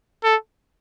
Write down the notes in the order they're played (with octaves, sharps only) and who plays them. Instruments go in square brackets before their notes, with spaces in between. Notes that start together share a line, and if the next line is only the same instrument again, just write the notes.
[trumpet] A4